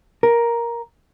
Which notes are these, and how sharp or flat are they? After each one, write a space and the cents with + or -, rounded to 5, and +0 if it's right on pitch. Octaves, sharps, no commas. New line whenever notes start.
A#4 +10